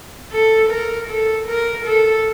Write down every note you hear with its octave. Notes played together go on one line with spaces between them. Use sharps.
A4
A#4
A4
A#4
A4